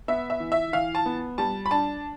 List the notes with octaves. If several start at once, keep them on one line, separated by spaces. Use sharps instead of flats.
B3 E5
E5
E3
E5
E3 F5
A5
B3
G3 A5
B5
D4 A5